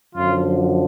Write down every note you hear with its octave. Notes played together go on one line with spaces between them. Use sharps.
F#2 D3 F3 F4